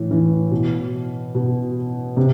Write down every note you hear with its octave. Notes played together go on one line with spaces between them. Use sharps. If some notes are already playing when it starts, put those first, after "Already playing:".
Already playing: A2 E3
E3
B2
B2
C3